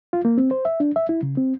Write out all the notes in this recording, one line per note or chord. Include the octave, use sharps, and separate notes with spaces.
F4
A#3
C4
C5
E5
D4
E5
E4
C#3
C4